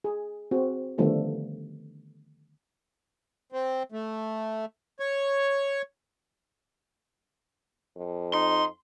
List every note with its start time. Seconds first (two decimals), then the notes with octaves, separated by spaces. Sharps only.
0.04 G#4
0.51 C4 F#4 G#4
0.98 D3 D#3 F3 G3 A3 B3
3.52 C4
3.92 A3
5.00 C#5
7.97 F2
8.34 D#4 C6